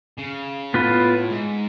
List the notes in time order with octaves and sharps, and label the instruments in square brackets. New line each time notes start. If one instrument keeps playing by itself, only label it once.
[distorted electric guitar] C#3
[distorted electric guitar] A2 [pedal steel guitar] B3 F4 B4
[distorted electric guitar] G#2